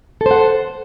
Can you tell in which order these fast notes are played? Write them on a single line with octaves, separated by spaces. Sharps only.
A4 C5 F#5